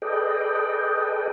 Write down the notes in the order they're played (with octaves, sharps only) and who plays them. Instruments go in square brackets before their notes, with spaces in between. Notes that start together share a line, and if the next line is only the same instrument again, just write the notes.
[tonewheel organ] G#4 A4 B4 D5 D#5 G5